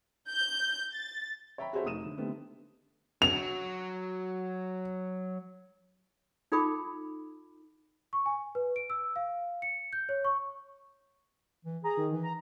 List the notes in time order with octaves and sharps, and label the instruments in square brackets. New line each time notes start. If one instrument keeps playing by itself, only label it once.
[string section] G6
A6
[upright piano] C#5 E5 G5 A#5 B5
F#4 G#4 A4 C5 C#5 E5
F1 A#3 D#4 D#6 D#7 E7
D3
D3 G3 A3 B3 C4 D#4
[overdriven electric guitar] F#3 [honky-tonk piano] F7
[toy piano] D#4 F4 A4 G5 B5 D6
[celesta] C#6
G#5
B4
D7
E6
F5
C#7
G6
C#5
C#6
[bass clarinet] E3
[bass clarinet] G#4 [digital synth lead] A#5
[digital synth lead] D#3
[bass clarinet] E3
[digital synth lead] A#5